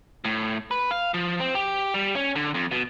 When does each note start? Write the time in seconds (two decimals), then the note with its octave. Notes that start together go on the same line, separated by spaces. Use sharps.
0.25 A2
0.71 B4
0.91 F5
1.14 F3
1.40 C4
1.55 G4
1.94 G3
2.15 C#4
2.35 D3
2.54 F2
2.71 B2